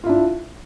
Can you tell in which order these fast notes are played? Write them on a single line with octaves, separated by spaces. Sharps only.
F4 E4 D4